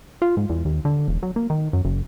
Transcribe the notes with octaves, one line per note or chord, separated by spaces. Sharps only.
F4
G#2
E2
D#2
D3
E1
F#3
A#3
D#3
F#2
F#1